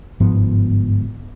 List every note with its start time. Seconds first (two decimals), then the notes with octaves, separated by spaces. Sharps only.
0.20 G1 G#2 F3 B3